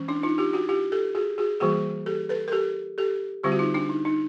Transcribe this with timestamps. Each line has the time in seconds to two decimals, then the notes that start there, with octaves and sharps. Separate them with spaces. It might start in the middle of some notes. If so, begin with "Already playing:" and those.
Already playing: E3 G#3 C#4
0.08 D4 E4
0.23 D#4 F4
0.38 F4 G4
0.53 E4 F#4
0.69 F4 G4
0.92 G4 A4
1.15 F#4 G#4
1.38 F#4 G#4
1.60 E3 G3 A#3 F#4 G#4
2.06 G4 A4
2.29 A4 B4
2.48 A#4
2.52 G4 A4
2.98 G4 A4
3.44 D3 G3 C4 F4 G4
3.52 F#4
3.59 D#4 F4
3.74 D4 E4
3.89 D#4
4.05 D#4